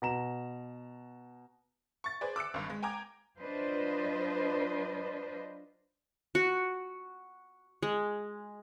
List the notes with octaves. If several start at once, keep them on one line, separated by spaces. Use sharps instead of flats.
B2 A#5 E7
C#6 A6
G#4 B4 C5 D5
D6 E6 F#6 C#7
G#1 G2
G#3
G5 G#5 A#5 D6 G#6
F#3 D4 F4 B4 C5 D#5
F#4
G#3